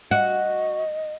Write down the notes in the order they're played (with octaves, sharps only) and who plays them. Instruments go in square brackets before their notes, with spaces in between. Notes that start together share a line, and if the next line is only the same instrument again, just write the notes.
[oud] F#4 [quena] D#5